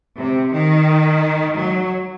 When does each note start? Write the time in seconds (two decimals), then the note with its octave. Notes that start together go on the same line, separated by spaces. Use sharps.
0.18 C3
0.53 D#3
1.57 F#3